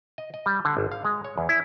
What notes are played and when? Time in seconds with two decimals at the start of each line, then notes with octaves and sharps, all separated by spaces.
0.18 D#5
0.34 D#5
0.46 G3
0.65 D3
0.77 G#1
0.92 F5
1.05 G#3
1.25 C#5
1.38 E2
1.49 E4